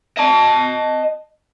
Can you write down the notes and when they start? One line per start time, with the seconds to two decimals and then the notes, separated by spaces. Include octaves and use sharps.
0.17 D#5 A5